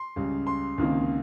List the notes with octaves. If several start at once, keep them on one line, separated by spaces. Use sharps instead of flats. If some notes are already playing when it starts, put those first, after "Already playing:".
Already playing: C6
C#2 C#3 G3
C6
C#2 C3 D#3 A#3 D#4